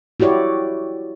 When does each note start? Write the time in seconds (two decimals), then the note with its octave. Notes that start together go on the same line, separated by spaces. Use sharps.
0.20 E4 F#4 G4 C#5 D5